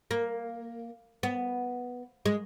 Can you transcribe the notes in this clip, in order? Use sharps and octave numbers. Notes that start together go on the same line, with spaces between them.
A#3
B3
G#3